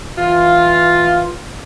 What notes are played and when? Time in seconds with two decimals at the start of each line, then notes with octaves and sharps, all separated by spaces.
0.18 E3 F4